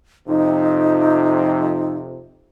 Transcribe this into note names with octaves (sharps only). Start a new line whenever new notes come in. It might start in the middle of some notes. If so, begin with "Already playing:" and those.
F2 C3 D#4